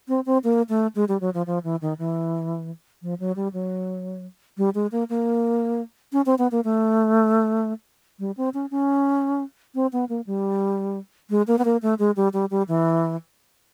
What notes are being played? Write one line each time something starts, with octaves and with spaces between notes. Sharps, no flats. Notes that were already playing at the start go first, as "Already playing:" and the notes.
C4
C4
A#3
A3
G#3
G3
F#3
F3
F3
E3
D#3
E3
F3
F#3
G3
F#3
G3
G#3
A#3
A#3
C#4
C4
B3
A#3
A3
G3
C4
C#4
C#4
C4
B3
A#3
G3
G#3
A#3
B3
A#3
A3
G#3
G3
G3
G3
E3